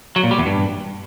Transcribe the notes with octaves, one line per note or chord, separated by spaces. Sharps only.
F#3
A#2
G3
E2
G2